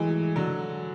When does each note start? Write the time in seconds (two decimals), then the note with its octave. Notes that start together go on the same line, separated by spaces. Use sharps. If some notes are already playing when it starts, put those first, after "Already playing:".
Already playing: E3 F#3 G#3 A3
0.36 D3 F#3